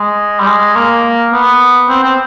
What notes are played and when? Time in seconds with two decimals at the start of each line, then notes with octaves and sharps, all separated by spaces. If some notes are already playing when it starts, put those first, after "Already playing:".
Already playing: G#3
0.40 G3
0.47 G#3
0.76 A#3
1.32 B3
1.89 C4
2.03 C4